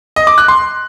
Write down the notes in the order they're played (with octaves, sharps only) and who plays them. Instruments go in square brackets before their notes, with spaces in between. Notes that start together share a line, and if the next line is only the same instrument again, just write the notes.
[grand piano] D#5
D6
F#6
C6